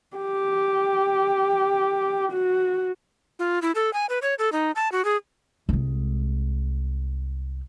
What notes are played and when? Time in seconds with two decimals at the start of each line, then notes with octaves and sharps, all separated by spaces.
0.17 G4
2.31 F#4
3.39 F4
3.62 E4
3.75 A4
3.93 G#5
4.09 B4
4.22 C#5
4.39 A4
4.52 D#4
4.76 A5
4.92 F#4
5.05 G#4
5.69 C2 G#3